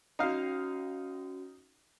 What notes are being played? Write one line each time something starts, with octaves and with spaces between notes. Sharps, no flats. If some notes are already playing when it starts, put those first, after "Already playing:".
C#4 D#4 F#4 F5